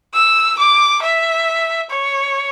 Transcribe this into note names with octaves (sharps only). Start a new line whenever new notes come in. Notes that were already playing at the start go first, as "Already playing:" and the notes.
E6
D6
E5
C#5